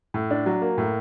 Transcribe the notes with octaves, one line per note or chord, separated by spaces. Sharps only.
A2
D4
F#3
A#3
A2